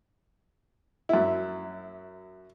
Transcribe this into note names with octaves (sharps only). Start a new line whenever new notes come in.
F#2 E4